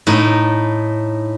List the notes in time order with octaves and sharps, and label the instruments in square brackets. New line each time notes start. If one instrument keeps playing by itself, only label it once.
[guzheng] A2 D#4